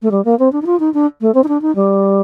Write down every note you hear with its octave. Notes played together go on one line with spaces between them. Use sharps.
A3
G3
A#3
C4
D4
D#4
F4
D#4
D4
A3
C4
D#4
D4
D#4
G3